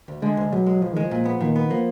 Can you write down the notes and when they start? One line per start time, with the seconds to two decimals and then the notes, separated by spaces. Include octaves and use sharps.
0.08 D2
0.22 D3 G#3
0.37 D2
0.52 B1 F#3
0.66 G#3
0.81 B1 F3
0.93 D#3 G#3
1.03 F3
1.11 A#2
1.25 B3
1.41 A#2 D#3
1.56 B3
1.70 F3 A#3